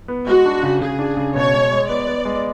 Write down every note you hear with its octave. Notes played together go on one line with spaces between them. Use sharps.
B3
G#3 F#4
D4
C#3
C#3 G#4
D4
C#3
B2 C#5
G#3
G#3
B3 D5
B3
G#3